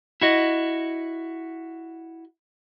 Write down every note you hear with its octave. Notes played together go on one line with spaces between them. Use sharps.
E4 F#4 D#5